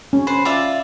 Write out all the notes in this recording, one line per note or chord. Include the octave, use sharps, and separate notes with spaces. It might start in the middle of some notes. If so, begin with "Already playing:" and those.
C#4
B4 C5
F4 D5 E5